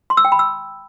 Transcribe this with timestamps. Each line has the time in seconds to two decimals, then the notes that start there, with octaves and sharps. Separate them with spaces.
0.10 C6
0.17 E6
0.25 G5
0.32 B5
0.39 E6